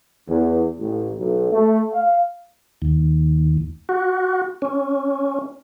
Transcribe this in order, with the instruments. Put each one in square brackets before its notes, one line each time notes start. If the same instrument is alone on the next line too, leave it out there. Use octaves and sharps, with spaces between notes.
[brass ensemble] E2
A1
B1
A3
F5
[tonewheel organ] D#2
F#4
C#4